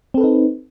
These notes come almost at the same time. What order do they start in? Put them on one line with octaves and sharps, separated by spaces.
C4 A4 B4 D#4